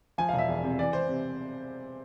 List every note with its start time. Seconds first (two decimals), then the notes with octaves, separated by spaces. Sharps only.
0.18 F3 G#5
0.29 F5
0.33 E1
0.38 E5
0.49 E2
0.63 C3
0.79 E3 D5
0.93 E3 C5
1.09 C3